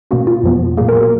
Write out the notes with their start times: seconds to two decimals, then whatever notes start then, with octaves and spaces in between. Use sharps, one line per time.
0.11 B2 A#3 C#4 F#4
0.27 F4
0.44 F2 F3 B3
0.77 A#2 F#3 A#3 G#4
0.89 A#4
1.00 F#4